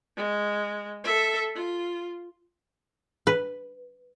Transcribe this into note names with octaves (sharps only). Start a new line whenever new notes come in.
G#3
A4 E5
F4
B4